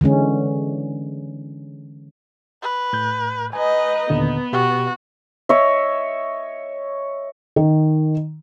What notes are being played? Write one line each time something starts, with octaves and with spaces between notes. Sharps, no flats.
D3 E3 G#3 C#4
B4
A2 G6
D#4 B4 D#5 G#5
D#2 A#2 D3 B3
B2 F#4 G4
C#5 D#5 E5
D#3